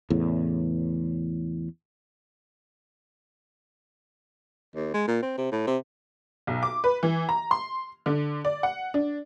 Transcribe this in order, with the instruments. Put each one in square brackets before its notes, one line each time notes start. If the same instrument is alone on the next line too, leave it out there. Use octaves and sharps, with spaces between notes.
[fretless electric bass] E2 A2 C#3
[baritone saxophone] D#2
G#3
A#2
C4
C3
A2
C3
[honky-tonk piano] B1
D6
B4
E3
A#5
C6
D3
D5
F#5
D4